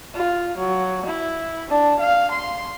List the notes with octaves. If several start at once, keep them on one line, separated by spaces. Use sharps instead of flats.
F4
F#3
E4
D4
F5
C6